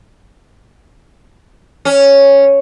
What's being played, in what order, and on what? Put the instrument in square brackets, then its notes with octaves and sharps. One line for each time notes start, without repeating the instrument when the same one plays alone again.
[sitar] C#4